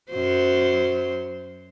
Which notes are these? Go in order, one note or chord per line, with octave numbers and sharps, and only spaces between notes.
F#2 F#3 C5